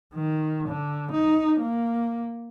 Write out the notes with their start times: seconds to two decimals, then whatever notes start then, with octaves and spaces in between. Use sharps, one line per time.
0.14 D#3
0.68 D3
1.11 D#4
1.60 A#3